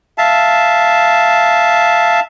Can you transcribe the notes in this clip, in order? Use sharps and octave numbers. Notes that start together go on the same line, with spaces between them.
E5 F5 A5